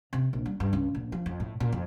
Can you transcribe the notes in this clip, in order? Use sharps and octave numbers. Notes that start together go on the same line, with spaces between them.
C3
A#1
G3
G2
C#2
A#1
F3
F2
A2
A#2
F2